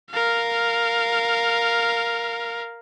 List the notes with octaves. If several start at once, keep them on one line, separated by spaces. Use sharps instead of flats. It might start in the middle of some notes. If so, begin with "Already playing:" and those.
A#4 F5